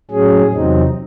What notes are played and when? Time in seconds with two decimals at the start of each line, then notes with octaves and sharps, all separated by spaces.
0.11 A2 F#3 C#4 G#4
0.51 E2 C3 F#3 C4 D#4